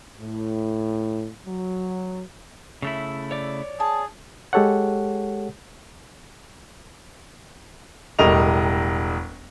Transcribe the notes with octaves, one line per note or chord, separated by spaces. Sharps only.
A2
F#3
C#3 A3 E4 E5
C#5 D5
G#4 A5
G#3 G4 A4 C#5 F#5
E1 A2 G3 A#4 D#5 F7